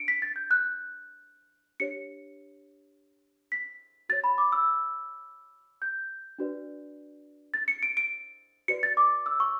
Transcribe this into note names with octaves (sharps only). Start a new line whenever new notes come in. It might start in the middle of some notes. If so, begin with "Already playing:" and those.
Already playing: D4 C#7 D7
B6
A6
G6
F#6
D4 G4 C#5 C#7
B6
F#4 C#5 A6
B5
D6
E6
G6
D4 F#4 B4 D5
A6
C#7
D7
D7
F#4 B4 D5 C#7
A6
D6
E6
C#6